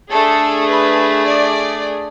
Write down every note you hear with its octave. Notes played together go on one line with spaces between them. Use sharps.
A3 D4 G#4 A4
B4
D5